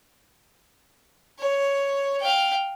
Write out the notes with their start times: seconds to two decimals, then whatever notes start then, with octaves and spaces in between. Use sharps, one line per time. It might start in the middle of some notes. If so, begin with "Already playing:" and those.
1.39 C#5
2.20 F5 G5